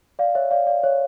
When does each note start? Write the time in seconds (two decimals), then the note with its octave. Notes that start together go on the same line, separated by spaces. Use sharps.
0.19 D5 F5
0.35 C#5 E5
0.51 D5 F5
0.67 D5 F5
0.84 C#5